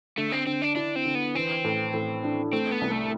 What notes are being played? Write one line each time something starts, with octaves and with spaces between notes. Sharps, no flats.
D3 A3
C4
D3 C4
D4
D4 E4
C4
D3
B3
E3 C4
A2
A2
D4
A3 C4
B3
C2
A3